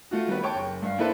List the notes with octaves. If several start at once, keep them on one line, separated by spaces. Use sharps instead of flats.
A3 F4 F#4
D#3 G3 B3 B4
C#5 G5 A5 C#6
F#1
G2 F5
A#3 D4 E4 A4 B4 C5